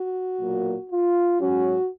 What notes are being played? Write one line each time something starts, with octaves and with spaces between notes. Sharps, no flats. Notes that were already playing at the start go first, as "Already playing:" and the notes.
Already playing: F#4
B1 A#2 F#3 A#3
F4
G#2 F#3 C#4 F#4